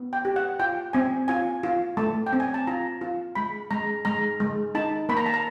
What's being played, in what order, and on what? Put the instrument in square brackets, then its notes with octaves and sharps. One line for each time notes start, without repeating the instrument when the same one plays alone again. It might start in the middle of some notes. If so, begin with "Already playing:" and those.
Already playing: [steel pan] B3
G5
G4
F#5
F4 G5
C4 G#5
F4 G#5
F4
A3 A5
G5
C4
G#5
A5
F4 A#5
F4
G#3 B5
G#3 A#5
G#3 A#5
G#3
D#4 A5
A#3 B5
A#5
A5
A#5